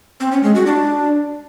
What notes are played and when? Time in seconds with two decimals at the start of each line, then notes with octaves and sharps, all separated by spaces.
0.20 C4
0.32 C#4
0.43 G#3
0.55 F#4
0.66 D4